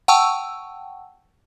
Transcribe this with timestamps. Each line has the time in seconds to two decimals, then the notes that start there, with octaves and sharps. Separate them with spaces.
0.08 F#5 G5 A5 C#6 E6